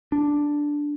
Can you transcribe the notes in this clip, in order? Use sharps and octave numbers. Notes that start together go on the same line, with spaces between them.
D4